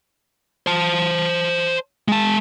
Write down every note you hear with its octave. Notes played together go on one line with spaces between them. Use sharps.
C5 A5
G#3 A5